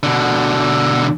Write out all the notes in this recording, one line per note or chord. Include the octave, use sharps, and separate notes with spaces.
B2 D3